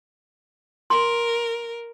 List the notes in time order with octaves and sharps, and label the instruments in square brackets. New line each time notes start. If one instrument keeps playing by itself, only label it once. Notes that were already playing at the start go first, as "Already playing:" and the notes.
[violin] A#4 [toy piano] C6